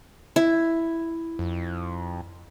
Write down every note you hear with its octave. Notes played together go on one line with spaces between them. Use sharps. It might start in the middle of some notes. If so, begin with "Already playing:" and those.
E4
F2